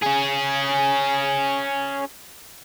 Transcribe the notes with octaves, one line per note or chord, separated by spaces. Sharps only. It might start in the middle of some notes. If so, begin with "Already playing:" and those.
C#4 G#4